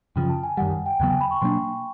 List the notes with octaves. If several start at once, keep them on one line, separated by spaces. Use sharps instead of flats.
F#2 C#3 F3 G5
A5
G#5
F#2 D#3 G3 F#5
F#5
G5
E2 C#3 F#3 B3 G5
G#5
B5
C#6
B2 F#3 A#3 D4 C6